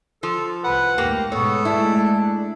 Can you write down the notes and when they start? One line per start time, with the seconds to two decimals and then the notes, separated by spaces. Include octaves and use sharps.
0.23 F3 A4
0.64 C2 B4 F#5
0.98 D#2 G#2 A3 A#3 G4
1.32 G#2 B2 G#3 B3 A4 C#5
1.65 G#3 A3 D4 E4